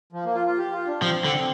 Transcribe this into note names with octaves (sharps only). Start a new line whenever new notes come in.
F3
A#3
F4
F4
G4
F4
D4
F3 C4
D3